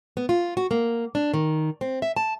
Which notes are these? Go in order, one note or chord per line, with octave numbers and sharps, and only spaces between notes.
B3
F4
F#4
A#3
D4
D#3
C4
E5
A5